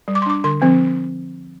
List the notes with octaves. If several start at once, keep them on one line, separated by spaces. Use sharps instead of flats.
G3
D6
C6
D4 D6
D3 C6
F3 C4